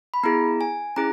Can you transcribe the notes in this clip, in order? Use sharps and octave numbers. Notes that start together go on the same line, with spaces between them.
B5
B3 E4 G#4 A#5
G#5
C#4 E4 G#4 A#5